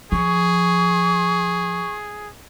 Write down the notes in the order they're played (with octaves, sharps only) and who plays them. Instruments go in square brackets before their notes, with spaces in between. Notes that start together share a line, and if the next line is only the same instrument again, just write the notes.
[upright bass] F3 [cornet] G#4 [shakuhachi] C#6